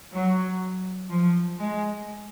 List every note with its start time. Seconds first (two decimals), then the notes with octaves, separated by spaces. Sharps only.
0.13 F#3
1.10 F3
1.59 G#3